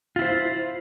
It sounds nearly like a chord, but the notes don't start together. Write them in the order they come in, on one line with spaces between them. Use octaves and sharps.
F4 E4 C5